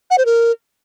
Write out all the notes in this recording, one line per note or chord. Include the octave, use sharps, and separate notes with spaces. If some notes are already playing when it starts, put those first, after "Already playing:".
F#5
C5
A#4